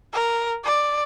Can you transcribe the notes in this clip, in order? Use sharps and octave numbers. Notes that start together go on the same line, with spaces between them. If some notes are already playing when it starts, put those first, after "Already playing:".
A#4
D5